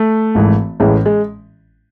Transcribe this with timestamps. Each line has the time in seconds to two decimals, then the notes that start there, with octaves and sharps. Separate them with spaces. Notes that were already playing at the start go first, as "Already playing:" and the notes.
Already playing: A3
0.35 G#1 G#2 E3
0.80 A1 A2 E3 G#3
1.06 G#3